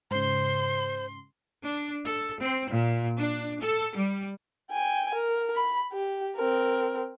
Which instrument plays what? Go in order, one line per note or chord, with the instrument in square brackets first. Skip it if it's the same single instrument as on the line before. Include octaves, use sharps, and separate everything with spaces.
[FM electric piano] G#2 C#3 [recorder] C5 [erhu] C6
[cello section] D4
A4
C4
A#2
D4
A4
G3
[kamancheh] G5 G#5
A#4
B5
G4
C4 A#4